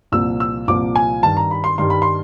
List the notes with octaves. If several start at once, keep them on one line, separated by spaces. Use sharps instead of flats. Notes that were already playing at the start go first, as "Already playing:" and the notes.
C2 A#2 F3 E6
E6
C2 A#2 F3 D6
G#5
G2 D#3 G3 A5
A#5
B5
C6
G2 D#3 G3 C6
B5
C6